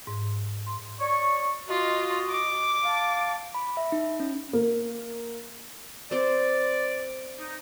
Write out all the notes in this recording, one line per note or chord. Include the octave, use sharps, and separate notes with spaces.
G#2
C6
C#5 D5 C#6
F4 F#4 D#5
D6
F5 A5
B5
E5
D#4
C#4
A#3
C4 C5 D5
D#4